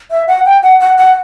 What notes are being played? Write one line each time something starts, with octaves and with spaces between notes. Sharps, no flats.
E5
F#5
G5
F#5
F#5
F#5